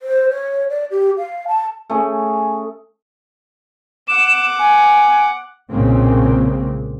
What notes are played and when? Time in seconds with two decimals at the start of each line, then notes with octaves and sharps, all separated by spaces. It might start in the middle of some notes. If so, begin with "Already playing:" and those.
0.02 C5
0.30 C#5
0.70 D5
0.91 G4
1.18 F5
1.48 A5
1.90 A3 C#4 G#4
4.08 F#5 D6 E7
4.59 G#5
5.71 B1 A#2 C#3 G#3 A#3 C4